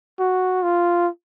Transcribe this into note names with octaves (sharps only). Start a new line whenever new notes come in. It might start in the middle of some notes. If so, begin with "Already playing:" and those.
F#4
F4